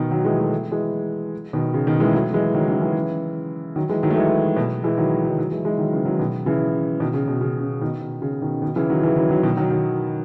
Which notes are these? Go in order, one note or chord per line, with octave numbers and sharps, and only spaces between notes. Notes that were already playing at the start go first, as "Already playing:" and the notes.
Already playing: B2 D#3
D#3 F#3
E3 G#3
F#3 A3
E3 G#3
B2 D#3
C#3
B2 D#3
E3 G#3
F#3 A3
E3 G#3
D#3 F#3
C#3 E3
C#3 E3
D#3 F#3
E3 G#3
D#3 F#3
A3
E3 G#3
B2
E3 G#3
D#3 F#3
D#3 F#3
D#3 F#3
E3 G#3
E3 G#3
D#3 F#3
C#3 E3
D#3 F#3
B2 D#3
C#3 E3
B2 D#3
C#3
B2
C#3
C#3
B2 D#3
B2
C#3
B2 D#3
B2 D#3
C#3 E3
D#3 F#3
C#3 E3
D#3 F#3
D#3 F#3
B2 D#3
D#3 F#3
D#3 F#3